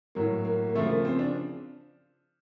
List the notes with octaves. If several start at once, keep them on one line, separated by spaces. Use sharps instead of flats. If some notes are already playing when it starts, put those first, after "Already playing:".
A2 F#3 A#3
A#3
A#3
C#3 F3 A3
A#3
C4
D4